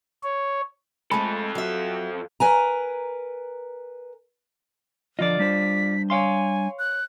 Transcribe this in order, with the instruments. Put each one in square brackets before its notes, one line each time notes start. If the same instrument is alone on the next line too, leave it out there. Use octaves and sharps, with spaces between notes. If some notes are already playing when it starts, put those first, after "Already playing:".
[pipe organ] C#5
[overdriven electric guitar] F2 A4 [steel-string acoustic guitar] G#3 A3 [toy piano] B5
[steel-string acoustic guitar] F#3 E5
A#4 B4 G#5 A#5
[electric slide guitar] D3 F3 D#5 [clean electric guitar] F4 D5
[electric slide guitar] G3 D4 C5 [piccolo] B6
[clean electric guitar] C#5 F5 C6 [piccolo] G#5
[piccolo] F#6